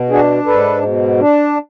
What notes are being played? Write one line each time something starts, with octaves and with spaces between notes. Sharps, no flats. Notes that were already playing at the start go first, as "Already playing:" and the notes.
Already playing: B2
D4 F#4 G#4
G#2 A4 B4
B2
D4